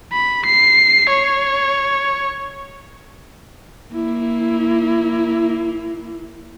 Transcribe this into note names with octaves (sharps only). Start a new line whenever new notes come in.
B5
C7
C#5
A#3 E4